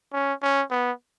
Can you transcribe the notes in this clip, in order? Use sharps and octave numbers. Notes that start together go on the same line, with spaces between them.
C#4
C#4
B3